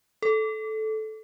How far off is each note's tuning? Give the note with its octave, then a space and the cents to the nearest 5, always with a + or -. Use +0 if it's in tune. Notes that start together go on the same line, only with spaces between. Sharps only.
A4 -10